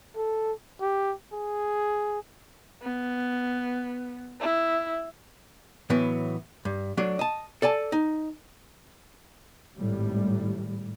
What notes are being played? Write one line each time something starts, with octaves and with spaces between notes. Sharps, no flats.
A4
G4
G#4
B3
E4
A2 E3 F#3 B3
G2
F#3 A3 D4
D#5 A5
A4 D5 G#5 A5
D#4
G#1 A2 G3